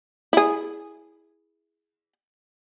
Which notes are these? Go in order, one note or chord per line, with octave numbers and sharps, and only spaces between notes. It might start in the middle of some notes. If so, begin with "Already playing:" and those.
E4 G#4